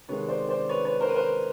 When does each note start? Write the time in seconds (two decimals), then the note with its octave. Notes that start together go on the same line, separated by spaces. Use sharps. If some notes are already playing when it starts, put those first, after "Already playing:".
0.08 C3 D#3 G#3 B3 B4 C#5
0.28 C5 D5
0.49 C5 D5
0.69 B4 C#5
0.85 B4 C#5
1.01 A#4 C5
1.09 B4
1.16 A#4 C5